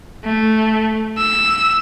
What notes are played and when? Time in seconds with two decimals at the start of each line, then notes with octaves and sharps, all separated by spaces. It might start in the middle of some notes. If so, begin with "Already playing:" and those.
0.25 A3
1.18 E6